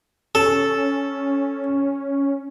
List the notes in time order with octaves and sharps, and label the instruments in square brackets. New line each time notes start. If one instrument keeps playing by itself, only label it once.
[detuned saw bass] C#4 [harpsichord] A4